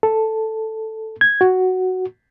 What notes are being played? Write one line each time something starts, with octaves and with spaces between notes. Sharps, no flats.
A4
G#6
F#4